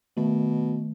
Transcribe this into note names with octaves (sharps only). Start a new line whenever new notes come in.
B2 D#3 A3